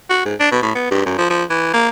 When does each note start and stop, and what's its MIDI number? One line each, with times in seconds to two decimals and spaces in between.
0.10 0.21 66
0.25 0.35 44
0.40 0.50 62
0.52 0.59 47
0.63 0.71 45
0.75 0.88 59
0.91 1.02 43
1.06 1.14 42
1.18 1.26 53
1.30 1.44 53
1.50 1.73 52
1.74 1.89 58